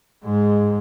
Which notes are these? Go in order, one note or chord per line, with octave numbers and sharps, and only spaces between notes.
G#2 G#3